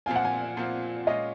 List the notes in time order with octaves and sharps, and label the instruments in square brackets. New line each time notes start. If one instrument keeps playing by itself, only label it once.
[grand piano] A#2 F3 C4 F4 [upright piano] G#5
[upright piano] F#5
G#5
[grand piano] A#2 F3 C4 F4
[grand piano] A#2 G#3 C#4 F4 [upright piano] D#5